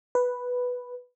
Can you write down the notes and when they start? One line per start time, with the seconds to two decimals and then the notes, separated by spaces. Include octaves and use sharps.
0.15 B4